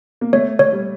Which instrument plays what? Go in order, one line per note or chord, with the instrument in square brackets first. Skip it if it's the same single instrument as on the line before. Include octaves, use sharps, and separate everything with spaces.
[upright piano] A#3
[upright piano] A3 [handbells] C#5
[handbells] C#5
[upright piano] G3